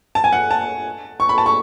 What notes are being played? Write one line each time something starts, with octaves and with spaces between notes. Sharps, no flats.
A5
G#5
F#5
A5
C#6
B5
A5
C#6